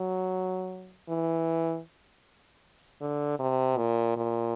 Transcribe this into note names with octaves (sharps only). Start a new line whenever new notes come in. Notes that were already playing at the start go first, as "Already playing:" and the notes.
Already playing: F#3
E3
D3
C3
A#2
A#2